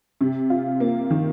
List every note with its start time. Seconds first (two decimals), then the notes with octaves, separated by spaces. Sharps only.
0.21 C3
0.50 F4
0.80 A#3
1.10 D#3